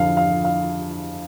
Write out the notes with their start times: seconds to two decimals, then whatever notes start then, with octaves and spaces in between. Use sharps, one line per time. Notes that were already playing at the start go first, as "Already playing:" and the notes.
Already playing: F2 D3 F3 F5
0.17 F5
0.44 F5